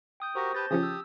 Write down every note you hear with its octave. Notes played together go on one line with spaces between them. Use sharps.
G5 D#6 G6
F#4 G4 A#4 C5 C#6 A#6
G4 B4 A5 G6 A6
C#3 F3 C#4 G4 D#6
E6